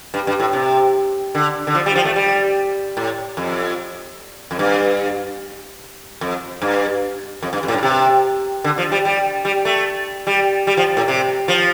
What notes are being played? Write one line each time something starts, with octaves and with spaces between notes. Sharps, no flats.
G2
G2
A2
C3
D3
D3
F3
G3
F3
A3
G3
A2
F2
F2
G2
F2
G2
F2
G2
F2
A2
G2
C3
D3
F3
G3
G3
G3
A3
G3
G3
F3
A2
C3
F3